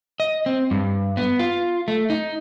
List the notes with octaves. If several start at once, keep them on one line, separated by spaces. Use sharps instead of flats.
D#5
C4
G2
B3
F4
A3
D#4